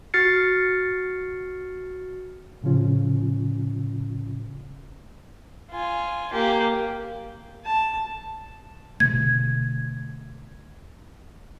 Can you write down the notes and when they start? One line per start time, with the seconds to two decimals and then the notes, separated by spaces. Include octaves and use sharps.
0.14 F#4 F6 A6 C7 C#7
2.63 A2 C#3 F3 C#4 F4
5.71 F4 G#5
6.32 A#3 G4
7.65 A5
9.00 B2 D3 A3 G#6